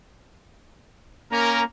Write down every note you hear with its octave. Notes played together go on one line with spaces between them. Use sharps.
A#3 C#4 A#4 A#5